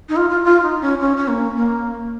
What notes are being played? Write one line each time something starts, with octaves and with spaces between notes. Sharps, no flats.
D#4
F4
F4
F4
D#4
C#4
C#4
C#4
A#3
A#3